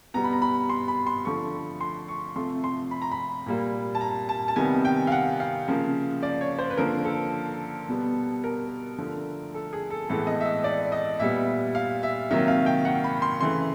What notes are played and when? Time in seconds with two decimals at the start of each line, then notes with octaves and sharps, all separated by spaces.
0.14 B2 G3 B3 A#5
0.24 B5
0.33 A#5
0.42 B5
0.69 C6
0.88 B5
1.07 C6
1.25 D3 F3 A3 C#6
1.81 C6
2.08 C#6
2.36 C3 F3 A3 C6
2.64 C6
2.91 B5
3.02 A#5
3.12 B5
3.46 A#2 G3 A#3
3.95 A5
4.01 A#5
4.29 A5
4.48 A5
4.56 C3 D#3 G3 B3 G#5
4.85 G5
5.07 F5
5.12 F#5
5.40 F5
5.68 C#3 F3 A#3
6.23 D5
6.41 C#5
6.59 C5
6.70 B4
6.77 D3 F3 A#3 A#4
7.05 A4
7.89 B2 G3 B3
8.44 A#4
8.98 D3 F3 A3
9.54 A4
9.73 G#4
9.91 A4
10.09 A2 E3 G#3 B3 A4
10.27 D#5
10.40 E5
10.45 D#5
10.64 D5
10.92 D#5
11.19 A#2 G3 B3 E5
11.75 F5
12.03 E5
12.31 C3 D#3 F#3 A#3 E5
12.48 F5
12.66 G5
12.85 F#5
13.04 B5
13.22 C6
13.40 C#3 E3 A3 C6